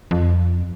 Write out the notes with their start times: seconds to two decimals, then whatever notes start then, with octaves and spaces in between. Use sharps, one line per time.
0.11 F2